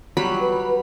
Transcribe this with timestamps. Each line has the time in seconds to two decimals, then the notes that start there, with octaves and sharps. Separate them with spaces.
0.17 F#3 G3 B5
0.40 B4